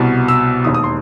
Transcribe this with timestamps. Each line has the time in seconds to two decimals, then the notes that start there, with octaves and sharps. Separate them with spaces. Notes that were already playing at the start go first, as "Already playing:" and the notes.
Already playing: C2 B2
0.28 E6
0.64 E1 D#2 D#3 D#6
0.74 D#6
0.84 C6